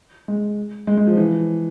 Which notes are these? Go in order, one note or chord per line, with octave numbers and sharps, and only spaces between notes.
G#3
G#3
G#3
F3
E3